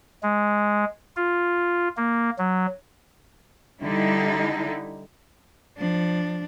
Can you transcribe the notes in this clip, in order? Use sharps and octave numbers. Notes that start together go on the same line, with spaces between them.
G#3
F4
A#3
F#3
D3 G3 D#4 E4
F3 D4